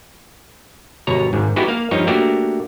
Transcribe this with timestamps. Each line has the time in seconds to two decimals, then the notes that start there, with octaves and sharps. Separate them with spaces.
1.07 G1 B2 C#5 A#5
1.33 G#1 G#2
1.56 G#3 B3 D#4 E4 F#4 G4
1.68 A#3 F5
1.91 G2 F3 D#4 C#5
2.07 A3 A#3 D4 F#4 G4